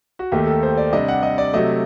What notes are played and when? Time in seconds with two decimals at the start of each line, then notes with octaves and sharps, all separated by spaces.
0.19 F#4
0.32 D#2 D#3 A3 G4
0.47 A4
0.63 C5
0.77 D5
0.93 C3 G3 D4 D#5
1.08 F#5
1.23 D#5
1.38 D5
1.53 C3 F#3 A3 D#5